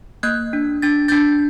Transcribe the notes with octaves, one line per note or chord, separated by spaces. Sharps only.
A#3 F#6 G#6
D4
D4 A6
D4 G6 A6